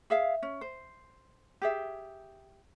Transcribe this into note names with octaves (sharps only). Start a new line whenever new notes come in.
G#4 E5 F5
C#4
C5
G4 G#4 E5